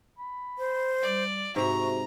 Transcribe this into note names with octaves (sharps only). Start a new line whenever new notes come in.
B5
C5
G3 D5
G#2 C3 F#4 E5 A#5 C#6